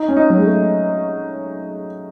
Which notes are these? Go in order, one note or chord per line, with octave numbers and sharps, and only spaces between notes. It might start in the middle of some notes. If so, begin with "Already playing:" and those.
Already playing: D#4
C#4
D#4
F#3
G#3
A3